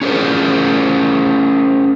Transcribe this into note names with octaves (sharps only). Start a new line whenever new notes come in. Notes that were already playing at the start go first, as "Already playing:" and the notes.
C#4 G#4 A#4 C5